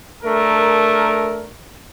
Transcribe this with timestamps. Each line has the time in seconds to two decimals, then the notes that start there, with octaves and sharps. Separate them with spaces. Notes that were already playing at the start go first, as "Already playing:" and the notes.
0.23 A3 D4 A#4